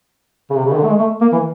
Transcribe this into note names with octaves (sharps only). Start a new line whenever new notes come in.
C#3
C3
C#3
D#3
D3
A3
G#3
A3
A#3
E3